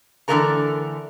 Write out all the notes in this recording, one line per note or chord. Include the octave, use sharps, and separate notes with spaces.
D3 E3 G#3 A3 A#4 A#5